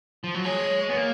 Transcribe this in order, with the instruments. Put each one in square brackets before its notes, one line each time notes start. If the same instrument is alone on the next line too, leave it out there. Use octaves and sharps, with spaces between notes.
[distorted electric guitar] F3
F#3
[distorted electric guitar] G#3 [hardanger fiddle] C#5
[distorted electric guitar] B3
A#3